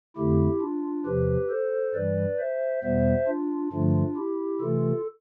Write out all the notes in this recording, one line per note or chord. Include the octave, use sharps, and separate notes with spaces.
F2 D3 A3 E4 G4
D4 F4
E2 C3 F3 G4 B4
A4 C5
G2 E3 G3 B4 D5
C5 E5
E2 B2 G3 B3 C5 E5
D4 F4
G2 D3 F3 A3 D4 F4
E4 G4
C3 E3 A3 F4 A4